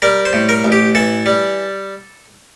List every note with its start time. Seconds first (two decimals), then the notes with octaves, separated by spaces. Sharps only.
0.02 G3 A#4
0.25 C5
0.33 A2
0.49 A#4
0.64 A1
0.72 G4
0.95 E3 A4
1.26 G3